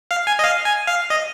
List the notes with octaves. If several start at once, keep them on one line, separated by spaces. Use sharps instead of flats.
F5
G#5
D#5
F5
G#5
F5
D#5